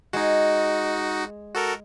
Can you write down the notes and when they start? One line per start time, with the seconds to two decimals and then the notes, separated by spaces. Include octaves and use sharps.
0.13 G#3 D#4 F#4
1.55 F#4 A4 A#4